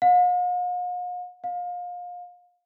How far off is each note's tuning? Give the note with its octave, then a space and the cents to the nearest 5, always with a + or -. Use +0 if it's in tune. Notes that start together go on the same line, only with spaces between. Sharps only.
F5 +45
F5 +30